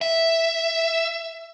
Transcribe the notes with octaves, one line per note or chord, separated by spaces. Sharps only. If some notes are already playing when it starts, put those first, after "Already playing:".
E5